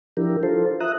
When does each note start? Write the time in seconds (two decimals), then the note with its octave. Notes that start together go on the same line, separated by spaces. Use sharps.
0.17 F3 D4 E4 G4 A#4
0.43 F4 A4 C5
0.80 E5 A#5 D#6 F#6